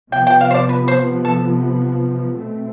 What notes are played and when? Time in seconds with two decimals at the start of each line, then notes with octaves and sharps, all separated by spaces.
0.12 C3 F3 B3 G5
0.27 G5
0.41 F5
0.51 C5
0.54 D5
0.69 B4
0.88 C5
1.25 A4
2.37 B2 A3 C4